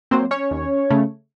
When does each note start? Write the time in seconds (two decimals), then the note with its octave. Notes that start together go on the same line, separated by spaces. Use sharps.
0.11 F#3 A#3 C4 C5
0.31 C#4 C#5
0.51 D#2
0.90 C#3 A3